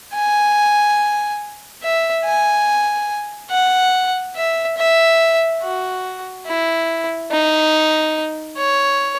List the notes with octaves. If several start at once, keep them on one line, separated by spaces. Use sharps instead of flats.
G#5
E5
G#5
F#5
E5
E5
F#4
E4
D#4
C#5